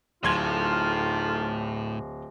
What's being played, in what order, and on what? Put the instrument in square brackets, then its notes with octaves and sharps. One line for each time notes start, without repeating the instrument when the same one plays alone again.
[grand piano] D1 C6 G#6 [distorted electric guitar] A2 [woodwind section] A3 D#4 F4